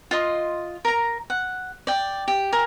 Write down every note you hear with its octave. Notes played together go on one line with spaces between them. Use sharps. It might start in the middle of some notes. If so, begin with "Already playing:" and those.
F4 D#5 C6
A#4 A#5
F#5
D5 G5
G4
A#4 G#5